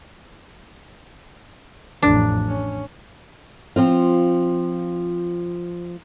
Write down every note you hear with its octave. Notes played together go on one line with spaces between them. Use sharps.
A1 F2 D4
C#4
F3 C4 F4